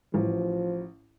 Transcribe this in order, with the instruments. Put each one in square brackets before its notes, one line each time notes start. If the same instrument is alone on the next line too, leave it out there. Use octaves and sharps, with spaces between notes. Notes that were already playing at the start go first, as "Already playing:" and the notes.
[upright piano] A1 [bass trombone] F3